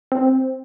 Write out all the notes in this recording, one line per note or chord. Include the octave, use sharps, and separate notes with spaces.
C4